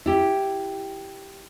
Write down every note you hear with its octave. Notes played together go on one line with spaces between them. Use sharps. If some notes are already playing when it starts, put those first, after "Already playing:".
E4 G4